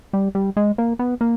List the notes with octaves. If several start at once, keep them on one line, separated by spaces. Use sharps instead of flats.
G3
G3
G#3
A#3
B3
A#3